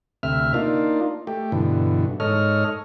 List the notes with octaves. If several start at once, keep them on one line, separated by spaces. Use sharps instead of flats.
D2 C3 E5 F6
A#3 D4 D#4 F4
A3 G4
G2 B2 D3 E3
G#2 A4 C#5 D#5 F6